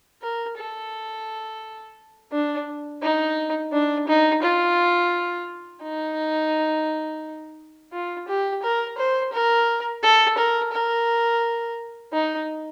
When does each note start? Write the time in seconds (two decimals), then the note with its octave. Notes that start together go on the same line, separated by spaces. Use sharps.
0.22 A#4
0.58 A4
2.32 D4
3.02 D#4
3.72 D4
4.07 D#4
4.42 F4
5.83 D#4
7.92 F4
8.28 G4
8.62 A#4
8.98 C5
9.32 A#4
10.03 A4
10.37 A#4
10.72 A#4
12.12 D#4